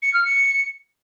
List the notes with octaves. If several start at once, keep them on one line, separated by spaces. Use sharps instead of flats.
C#7
F6
C#7